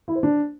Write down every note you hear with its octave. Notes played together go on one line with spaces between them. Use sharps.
E4
C5
D4